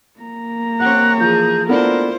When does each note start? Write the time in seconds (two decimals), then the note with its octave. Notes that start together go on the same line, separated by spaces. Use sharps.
0.20 A#3 A#5
0.80 C4 G4 C#5 F#5 F#6
1.20 E3 F3 G#4 G6
1.68 A3 B3 D4 E4 F4 A#4 C5